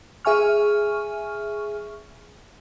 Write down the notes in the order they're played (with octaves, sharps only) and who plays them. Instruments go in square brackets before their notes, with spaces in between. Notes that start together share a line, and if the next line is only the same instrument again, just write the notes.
[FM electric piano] G#4 E5 G#5 C#6 F6